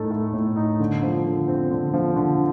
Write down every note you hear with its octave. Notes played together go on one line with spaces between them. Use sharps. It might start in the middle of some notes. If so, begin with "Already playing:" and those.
Already playing: A2 A3 D#4 A4
A3
A2
D#4
D3
F3
D3
C4
D3
F3
D3